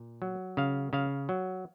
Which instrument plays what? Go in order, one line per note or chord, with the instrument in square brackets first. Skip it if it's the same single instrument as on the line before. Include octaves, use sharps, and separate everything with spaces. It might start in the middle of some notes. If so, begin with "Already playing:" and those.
Already playing: [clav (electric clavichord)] A#2
F#3
C#3 F5
C#3 F5
F#3